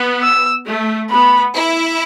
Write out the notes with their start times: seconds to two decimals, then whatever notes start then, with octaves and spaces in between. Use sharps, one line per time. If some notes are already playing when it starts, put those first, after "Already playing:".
Already playing: B3
0.23 E6
0.67 A3
1.11 B3 B5
1.54 E4